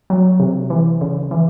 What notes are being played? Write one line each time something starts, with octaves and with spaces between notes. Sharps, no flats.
F#3
C3
E3
C#3
E3